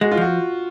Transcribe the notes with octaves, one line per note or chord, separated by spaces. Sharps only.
G#3 F#4
F4
F3 F#4